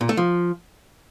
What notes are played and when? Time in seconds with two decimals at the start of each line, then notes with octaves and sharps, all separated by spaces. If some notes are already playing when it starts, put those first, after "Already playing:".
0.01 A#2
0.09 A3
0.17 F3